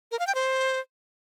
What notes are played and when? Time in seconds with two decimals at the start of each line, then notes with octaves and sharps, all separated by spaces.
0.12 A#4
0.19 F5
0.27 G5
0.35 C5